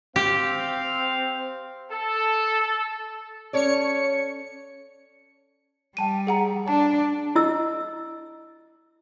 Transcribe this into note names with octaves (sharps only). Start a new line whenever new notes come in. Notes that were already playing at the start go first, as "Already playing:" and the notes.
C4 G4 F5
A4
C#4 A4 C#5 D5 C#7
G3 G5 A5 D#7
G#4 F#5 A#5
D4 A5
E4 D#5 E6